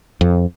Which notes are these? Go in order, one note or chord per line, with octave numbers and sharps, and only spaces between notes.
F2